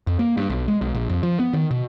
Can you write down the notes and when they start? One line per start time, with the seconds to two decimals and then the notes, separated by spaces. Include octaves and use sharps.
0.07 F2
0.19 A#3
0.37 G2
0.50 B1
0.68 G#3
0.81 B1
0.95 A#1
1.10 F2
1.23 F3
1.39 B3
1.54 D#3
1.71 B2